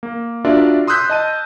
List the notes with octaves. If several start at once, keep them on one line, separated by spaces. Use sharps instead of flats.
A#3
D4 F4 F#4 A#4 D5 E5
C6 D#6 E6 F#6 G6 B6
D#5 A5 D#7